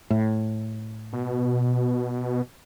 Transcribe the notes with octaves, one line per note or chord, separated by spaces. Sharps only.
A2
B2